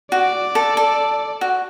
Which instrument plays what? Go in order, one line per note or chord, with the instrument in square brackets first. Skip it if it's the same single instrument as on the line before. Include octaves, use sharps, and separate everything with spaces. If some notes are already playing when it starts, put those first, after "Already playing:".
[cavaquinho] F#4 [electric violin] D5
[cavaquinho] A4
A4
F#4